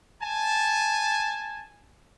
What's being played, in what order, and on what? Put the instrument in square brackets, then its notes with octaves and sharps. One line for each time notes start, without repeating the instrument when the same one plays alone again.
[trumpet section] G#5 A5